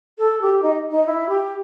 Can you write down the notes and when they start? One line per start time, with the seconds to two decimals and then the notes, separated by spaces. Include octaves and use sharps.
0.18 A4
0.41 G4
0.62 D#4
0.90 D#4
1.06 E4
1.28 G4